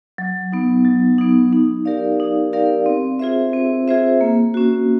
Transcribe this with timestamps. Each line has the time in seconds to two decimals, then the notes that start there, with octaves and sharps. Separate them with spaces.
0.18 F#3
0.52 B3 D#4
0.85 F#3
1.18 B3 D#4
1.53 D#4
1.85 G4 A#4 D5 F5
2.20 D#4
2.53 G4 A#4 D5 F5
2.86 C4
3.19 F4 G#4 C5 E5
3.53 C4
3.88 F4 G#4 C5 E5
4.21 A#3
4.54 C#4 F#4